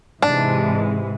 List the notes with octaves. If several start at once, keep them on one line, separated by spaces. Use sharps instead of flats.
G#2 C3 E3 G#3 D4